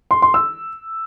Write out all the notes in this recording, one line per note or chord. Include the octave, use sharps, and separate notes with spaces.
C6
C6
E6